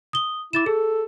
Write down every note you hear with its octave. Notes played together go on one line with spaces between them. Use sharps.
D#6 G7
E4 D6 A6 E7
G#4 A4